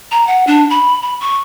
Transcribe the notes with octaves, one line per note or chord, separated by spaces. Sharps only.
A#5
F#5
D4
B5
B5
C#6